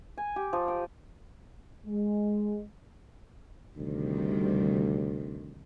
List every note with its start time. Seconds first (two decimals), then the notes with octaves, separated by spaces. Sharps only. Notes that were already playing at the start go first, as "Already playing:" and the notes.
0.18 G#5
0.36 G4
0.53 F3
0.68 G5
1.87 G#3
3.76 D2 C3 D#3 G3